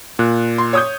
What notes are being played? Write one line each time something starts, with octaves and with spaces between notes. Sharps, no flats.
A#2 F#6
C6
C#5 D#6 G6